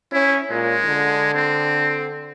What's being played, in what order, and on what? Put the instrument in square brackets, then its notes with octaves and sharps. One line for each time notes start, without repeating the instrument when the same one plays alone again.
[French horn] C#4 [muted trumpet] E4
[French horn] A#2 [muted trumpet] G#3
[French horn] D3
[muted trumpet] C4